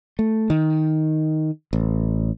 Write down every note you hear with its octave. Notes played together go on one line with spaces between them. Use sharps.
A3
D#3
A1